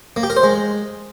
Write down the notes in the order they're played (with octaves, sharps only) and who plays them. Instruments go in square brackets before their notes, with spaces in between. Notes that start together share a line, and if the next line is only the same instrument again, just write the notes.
[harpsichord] A#3
G4
A#4
C5
G#3